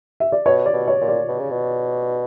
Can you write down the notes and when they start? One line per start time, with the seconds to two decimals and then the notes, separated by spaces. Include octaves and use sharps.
0.20 E5
0.32 D5
0.45 B2 C#5
0.66 D5
0.74 B2
0.88 C#5
1.01 A#2
1.08 D5
1.28 B2
1.39 C#3
1.51 B2